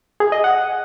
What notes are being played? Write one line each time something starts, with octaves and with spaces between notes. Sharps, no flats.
G#4
D#5
F#5